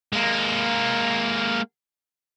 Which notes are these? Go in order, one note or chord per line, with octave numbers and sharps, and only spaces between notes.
G#3 A#3